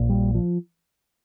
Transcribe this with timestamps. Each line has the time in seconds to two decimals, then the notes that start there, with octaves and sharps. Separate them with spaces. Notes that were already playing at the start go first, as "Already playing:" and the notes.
Already playing: A#1 A#2
0.09 G3
0.35 F3